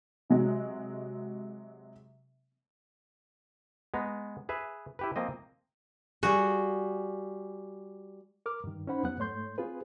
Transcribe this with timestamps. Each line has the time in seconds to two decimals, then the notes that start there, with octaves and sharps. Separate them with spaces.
0.30 C3 F#3 G#3
3.94 G#3 B3 A#5
4.49 G#4 B4 E5
4.99 E4 G4 B4
5.16 F3 A#3 C4 D#5
6.23 G3 F#4 G#4
8.46 A#4 D6 F6
8.64 G2 D#3
8.87 C#4 D#4 C5 F#5 B5
9.03 F2 F#3 B3 B4 F#5 F#6
9.18 G#2 A3 C#5 C6 G6
9.58 C4 F4 G#4 B4